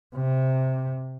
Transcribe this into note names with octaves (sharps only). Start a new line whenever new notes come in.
C3